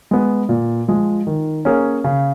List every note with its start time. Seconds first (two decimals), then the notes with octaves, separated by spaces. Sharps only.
0.11 G#3 B3
0.49 A#2
0.88 F3 G#3
1.27 D#3
1.65 A#3 C#4 G#4
2.04 C#3